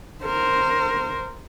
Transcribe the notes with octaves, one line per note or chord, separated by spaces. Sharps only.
A#4 C5